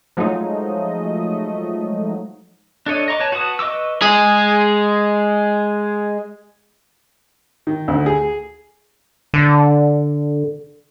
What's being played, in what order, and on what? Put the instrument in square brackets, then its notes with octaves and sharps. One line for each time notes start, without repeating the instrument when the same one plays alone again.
[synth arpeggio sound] F3 F#3 G#3 A3 D#4 D#5
[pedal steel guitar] D4 A4 C#5 D#5
D#5 A#5 C#6 D6
B4 C#5 A5
F#4 B4 A5 C#6 D#6
B4 D#5 C#6 D6 E6
[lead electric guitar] G#3 G#4
[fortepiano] D#3
D2
G#4
[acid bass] D3